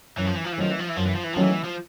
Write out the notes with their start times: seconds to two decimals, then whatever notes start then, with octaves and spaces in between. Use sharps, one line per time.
0.17 F#2 E3
0.26 F3
0.35 E3
0.45 F3
0.53 E3
0.58 D#3 F3 F#3 A3 C#4
0.71 E3
0.79 F3
0.89 E3
0.97 F#2 F3
1.06 E3
1.16 F3
1.24 E3
1.34 D#3 F3 F#3 A3 C#4
1.42 E3
1.64 F3